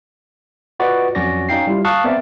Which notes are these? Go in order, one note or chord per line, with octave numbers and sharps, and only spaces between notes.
F4 F#4 B4 D5 D#5 F#5
F2 F#3 C#4 F#4 D5 A#6
C#4 D#4 F5 G5 C7
G3 E4 F4
F5 A5 C#6 D#6 F#6
B3 C4 A#4 D5 E5